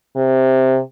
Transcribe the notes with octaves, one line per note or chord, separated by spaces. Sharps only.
C3